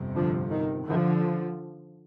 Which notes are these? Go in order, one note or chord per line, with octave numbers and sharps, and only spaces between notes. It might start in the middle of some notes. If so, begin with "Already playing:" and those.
Already playing: G1 F2 C3
D3 F3
D#3
D3 F3